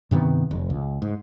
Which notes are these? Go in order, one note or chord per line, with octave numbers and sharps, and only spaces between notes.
G2 C3 D#3 B3
F1
C#2
G#2